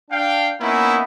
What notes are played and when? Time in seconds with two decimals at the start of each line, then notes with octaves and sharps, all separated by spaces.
0.11 D4 F5 G5
0.61 A#3 B3 C#4 D#4 E4